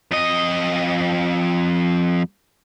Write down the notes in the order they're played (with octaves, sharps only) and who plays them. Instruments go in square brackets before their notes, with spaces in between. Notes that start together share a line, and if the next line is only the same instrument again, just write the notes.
[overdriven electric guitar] F2 D#5